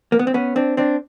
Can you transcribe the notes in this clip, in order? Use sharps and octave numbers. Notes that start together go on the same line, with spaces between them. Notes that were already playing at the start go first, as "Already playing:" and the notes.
A#3
B3
C4
B3 C#4
C4 D4
C4 D4